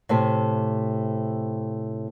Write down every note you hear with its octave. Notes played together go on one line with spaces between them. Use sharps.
A2 C3 A3